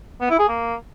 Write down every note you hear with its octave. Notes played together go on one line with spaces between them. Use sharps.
B3
E4
G#4
A#3